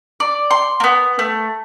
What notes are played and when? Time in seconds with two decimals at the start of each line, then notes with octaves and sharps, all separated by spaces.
0.20 D5
0.51 C6
0.80 A#3 B3
1.19 A3